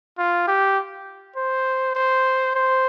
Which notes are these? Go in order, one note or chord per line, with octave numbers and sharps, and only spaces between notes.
F4
G4
C5
C5
C5